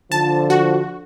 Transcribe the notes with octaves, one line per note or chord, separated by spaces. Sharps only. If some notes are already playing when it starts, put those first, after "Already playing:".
D3 F3 A5
F#4